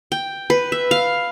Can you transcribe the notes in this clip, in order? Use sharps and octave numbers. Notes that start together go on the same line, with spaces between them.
G5
B4
E5
F5